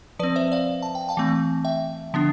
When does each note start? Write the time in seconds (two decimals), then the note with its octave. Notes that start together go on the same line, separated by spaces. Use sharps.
0.19 F3 C4 B4 D5
0.36 C5 E5
0.52 D5 F5
0.82 A5
0.95 G5
1.09 F5 A5
1.17 E3 A3 C4
1.65 E5 G5
2.14 D3 F3 B3 D4